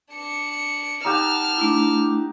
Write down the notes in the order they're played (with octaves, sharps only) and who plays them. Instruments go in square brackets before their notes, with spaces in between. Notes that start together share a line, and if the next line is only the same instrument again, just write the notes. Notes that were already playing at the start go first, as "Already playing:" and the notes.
[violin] D4 C#7
[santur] D#4 G4 F#5 [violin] A5 F6
[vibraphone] A3 D4 E4